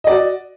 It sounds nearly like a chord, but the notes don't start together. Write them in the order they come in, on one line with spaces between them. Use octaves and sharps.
D#5 D5 F#4